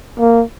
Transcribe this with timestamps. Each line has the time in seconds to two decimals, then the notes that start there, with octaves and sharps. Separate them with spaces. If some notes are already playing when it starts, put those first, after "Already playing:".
0.19 A#3